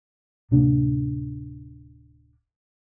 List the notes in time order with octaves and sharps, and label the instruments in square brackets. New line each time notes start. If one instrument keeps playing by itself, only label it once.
[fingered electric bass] D1 C3 A#3 D4